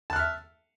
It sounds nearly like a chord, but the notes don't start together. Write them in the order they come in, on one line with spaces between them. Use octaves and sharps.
A5 F#6 F6 E5